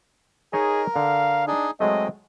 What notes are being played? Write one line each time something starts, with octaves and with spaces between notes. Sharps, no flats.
D#4 G#4 A#4 C#5 D#5
D3 F5
D4 D#4 G#4
F#3 G#3 A3 C4 D#5